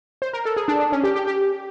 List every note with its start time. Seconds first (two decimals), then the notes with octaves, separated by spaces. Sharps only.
0.22 C5
0.33 A#4
0.45 A4
0.56 G#4
0.68 D4
0.80 D4
0.92 C#4
1.03 G4
1.16 G4
1.27 G4